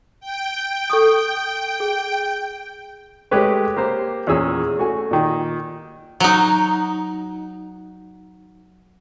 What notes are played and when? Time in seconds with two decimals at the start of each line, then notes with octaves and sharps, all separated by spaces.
0.20 G5
0.90 A4 C#6 D#6
1.80 G#4
3.31 G#3 A3 G4 B4 C#5
3.77 A#3 G4 C5
4.27 E2 A#2 C#4 G#4 E6
4.78 A3 F#4 G#5
5.11 A#2 D#3
6.20 F#3 D#4